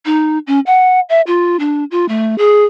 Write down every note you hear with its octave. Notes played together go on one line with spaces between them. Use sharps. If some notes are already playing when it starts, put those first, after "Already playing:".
D#4
C#4
F#5
E5
F4
D4
F4
A3
G#4